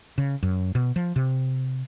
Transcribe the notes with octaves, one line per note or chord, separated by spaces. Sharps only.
C#3
F#2
B2
F3
C3